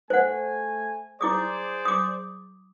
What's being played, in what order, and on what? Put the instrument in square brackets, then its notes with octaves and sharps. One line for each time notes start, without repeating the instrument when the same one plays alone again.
[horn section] A3 G#5 [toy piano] C5 F#5
[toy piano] E4 D6 D#6 [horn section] G#4 C5 D5
[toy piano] D6 D#6